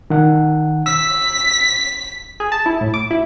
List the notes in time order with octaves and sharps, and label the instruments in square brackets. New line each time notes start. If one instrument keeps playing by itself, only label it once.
[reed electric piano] D#3 F#5
[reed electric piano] E6 [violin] B6
[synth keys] G#4
A5
E4
A2
D6
E4